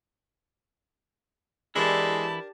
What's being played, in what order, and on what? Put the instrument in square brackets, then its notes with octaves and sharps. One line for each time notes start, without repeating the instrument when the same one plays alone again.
[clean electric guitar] E3 E4 [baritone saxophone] G#3 [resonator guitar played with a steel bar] D4 A#4 [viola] G4 A5